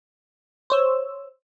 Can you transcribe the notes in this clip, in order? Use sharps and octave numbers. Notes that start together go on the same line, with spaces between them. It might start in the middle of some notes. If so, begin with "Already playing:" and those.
C5 C#5 E6